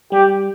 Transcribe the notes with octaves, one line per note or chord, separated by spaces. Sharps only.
G3 G4